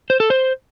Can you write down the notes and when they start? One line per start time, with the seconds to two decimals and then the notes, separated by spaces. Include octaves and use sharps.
0.10 C5
0.20 A4
0.30 C5